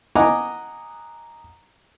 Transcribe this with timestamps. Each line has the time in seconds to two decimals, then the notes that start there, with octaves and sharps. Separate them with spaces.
0.16 D#5 F#5 G#5 A#5 D6